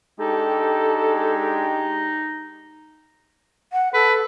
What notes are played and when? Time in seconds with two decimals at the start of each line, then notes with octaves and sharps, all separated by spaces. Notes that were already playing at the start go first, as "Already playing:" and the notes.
0.20 G#3 D4 D#4 G4 A4
3.73 F#5
3.94 A4 B4